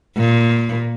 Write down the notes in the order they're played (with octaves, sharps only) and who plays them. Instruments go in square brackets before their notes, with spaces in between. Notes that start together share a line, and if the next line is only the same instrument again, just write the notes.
[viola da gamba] A#2